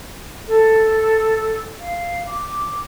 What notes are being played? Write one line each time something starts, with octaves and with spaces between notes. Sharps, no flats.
A4
F5
D6